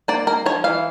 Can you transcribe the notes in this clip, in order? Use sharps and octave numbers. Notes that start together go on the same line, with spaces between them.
A#3 D5
A#3 A#4
F3 C#5
E3 F5